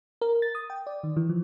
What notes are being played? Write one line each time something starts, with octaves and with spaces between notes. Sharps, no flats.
A#4
A6
D#6
G5
D5
D#3
E3
F3